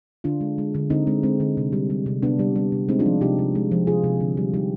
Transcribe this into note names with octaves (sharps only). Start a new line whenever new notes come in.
D3 D4 F4
G#3
G#3
D3
D3 C4 D#4
G#3 C4
G#3 C4
D3
C3
G3
G3
C3
C3 B3 D4
G3
G3
C3
G#3 C4 D#4
D4 F4
F3
C3 D#4 G4
C3
G#3
F3
C3 F4 G#4
C3
D3
G3
G3 D#4 G4